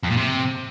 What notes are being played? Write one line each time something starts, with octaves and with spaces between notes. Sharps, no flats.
F2
A#2
C3